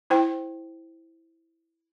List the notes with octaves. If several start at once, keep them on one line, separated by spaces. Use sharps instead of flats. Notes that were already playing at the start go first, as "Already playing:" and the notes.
E4 C5 G5